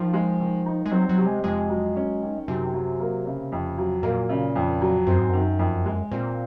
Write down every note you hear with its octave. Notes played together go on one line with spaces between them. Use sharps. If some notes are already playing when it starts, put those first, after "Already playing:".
Already playing: D#3 F3
G#3
D#3
D#4
G#3
F#3 C4
F#3
C3
G#3
F2 G#3
F#3
C#4
D#3
F#2 C3
F#3
A#3
C#3
F2
F#3
A#2 A#3
C#3
F2
F#3
F#2 C4
G#2
F#2 D#3
F2
G#3
A#2 C4